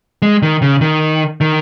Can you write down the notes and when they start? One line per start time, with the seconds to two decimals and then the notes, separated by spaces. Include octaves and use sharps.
0.22 G#3
0.42 D#3
0.62 C#3
0.81 D#3
1.41 D#3